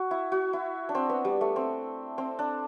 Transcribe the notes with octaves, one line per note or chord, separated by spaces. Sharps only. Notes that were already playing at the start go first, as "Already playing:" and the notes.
Already playing: F#4
E4
F#4
E4
D4
C4
B3
G3
A3
C4
C4
D4